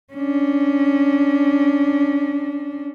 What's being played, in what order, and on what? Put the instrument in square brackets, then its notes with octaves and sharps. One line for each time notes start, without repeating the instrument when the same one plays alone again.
[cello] C#4 D4